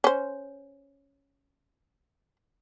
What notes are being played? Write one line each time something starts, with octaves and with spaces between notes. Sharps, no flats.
C#4 C5